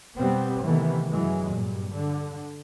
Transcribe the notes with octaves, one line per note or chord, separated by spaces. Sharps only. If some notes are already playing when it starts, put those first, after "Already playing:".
B2 G3 B3 C4
C3 D#3 E3 A3 B3
F#2 E3 F#3 G#3
G2 A#2
D3